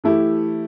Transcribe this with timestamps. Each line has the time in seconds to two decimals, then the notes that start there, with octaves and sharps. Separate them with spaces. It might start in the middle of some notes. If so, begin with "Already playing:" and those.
0.04 E3 A3 E4 G4